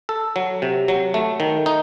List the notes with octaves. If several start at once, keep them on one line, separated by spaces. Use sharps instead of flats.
A4
F#3
C3
F#3
A3
D#3
D#4